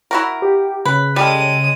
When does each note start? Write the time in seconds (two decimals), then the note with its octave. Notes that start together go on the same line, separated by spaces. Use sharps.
0.11 E4 F#4 A#4
0.42 G4
0.85 C#3 B4
1.16 G3 G#3 A4 F5 D#6